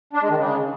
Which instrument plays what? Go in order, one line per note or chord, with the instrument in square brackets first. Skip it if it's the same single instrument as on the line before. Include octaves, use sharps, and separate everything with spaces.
[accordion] D4
G#3
D#3
C#3